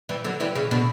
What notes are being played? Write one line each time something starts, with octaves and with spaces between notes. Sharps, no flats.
E3 G3
D3 F#3
E3 G3
C#3 E3
B2 D3